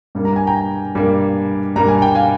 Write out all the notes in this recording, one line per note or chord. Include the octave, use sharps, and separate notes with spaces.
G2 G3 A#3
A#5
G#5
G5 A#5
G2 G3 A#3
G2 G3 A#3 A#5
G#5
G5
F5 G#5